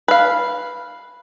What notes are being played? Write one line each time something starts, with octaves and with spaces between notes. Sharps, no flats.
B4 F5